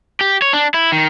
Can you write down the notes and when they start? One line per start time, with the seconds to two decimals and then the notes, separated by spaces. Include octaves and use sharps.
0.21 G4
0.42 C#5
0.53 D4
0.74 E4
0.92 D#3